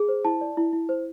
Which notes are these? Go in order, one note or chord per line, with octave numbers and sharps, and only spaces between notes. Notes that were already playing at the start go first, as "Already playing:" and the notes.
Already playing: G#4
C5
E4 A5
D5
E4
E4
C5